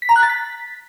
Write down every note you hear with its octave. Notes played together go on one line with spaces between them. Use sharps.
B6
A#5
F#6
A6
B6